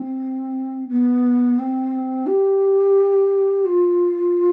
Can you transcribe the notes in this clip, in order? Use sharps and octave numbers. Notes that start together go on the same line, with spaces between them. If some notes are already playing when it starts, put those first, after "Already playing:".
Already playing: C4
B3
C4
G4
F4